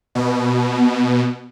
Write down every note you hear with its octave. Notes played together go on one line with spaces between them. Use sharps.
B2